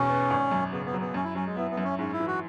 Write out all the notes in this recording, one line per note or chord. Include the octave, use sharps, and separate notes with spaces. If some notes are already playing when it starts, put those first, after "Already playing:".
Already playing: E1 E2 G#2 B2 C#4
B3
G#1
F#2
C#3 B3
B3
F#3
B3
F#2 C#4
E4
F#3 C#4
G#3
B3 E4
B3
F#2
C#4
G#2 C#4
E4
E3
F#4